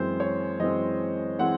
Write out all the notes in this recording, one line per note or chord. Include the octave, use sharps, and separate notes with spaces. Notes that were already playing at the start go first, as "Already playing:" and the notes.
Already playing: F#2 E3 G#3 C4 C5
C#5
F#2 E3 G#3 C4 D#5
E3 G#3 C4 F#5